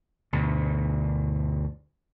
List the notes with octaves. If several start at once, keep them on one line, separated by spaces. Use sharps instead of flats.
D2 G2 B2